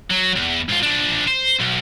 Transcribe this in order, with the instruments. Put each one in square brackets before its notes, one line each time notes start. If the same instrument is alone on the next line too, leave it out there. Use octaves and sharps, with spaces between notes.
[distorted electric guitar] F#3
E2
G#2 F4
F3 D4
C5
B1